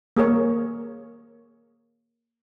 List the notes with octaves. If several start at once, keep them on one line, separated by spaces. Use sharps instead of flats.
A#3 G#4 A#4 C#5